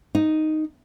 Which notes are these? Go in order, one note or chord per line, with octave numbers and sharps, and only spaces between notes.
D#4